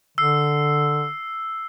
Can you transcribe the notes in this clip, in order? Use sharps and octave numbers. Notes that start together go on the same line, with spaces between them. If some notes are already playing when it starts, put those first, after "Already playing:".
D3 E6 C7